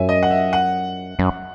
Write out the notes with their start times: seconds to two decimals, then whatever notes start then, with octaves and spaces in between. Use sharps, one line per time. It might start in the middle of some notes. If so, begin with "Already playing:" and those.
Already playing: F#2 E5 G#5
0.09 D#5
0.23 F#5
0.31 E5
0.53 F#5
1.19 F#2